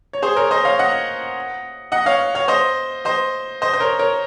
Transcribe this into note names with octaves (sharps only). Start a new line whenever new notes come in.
C#5
G#4 C5
A#4 C#5
C5 D#5
C#5 F5
D#5 F#5
D#5 F#5
C#5 F5
C#5 F5
C5 D#5
C5 D#5
C5 D#5
C5
A#4 C#5
A#4 C#5